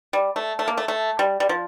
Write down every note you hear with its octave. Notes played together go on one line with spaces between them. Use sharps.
G3
A3
A3
A#3
A3
A3
G3
G3
F3